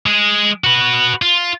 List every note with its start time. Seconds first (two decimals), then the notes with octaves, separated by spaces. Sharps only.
0.06 G#3 G#4
0.64 F#4 B4
1.22 F4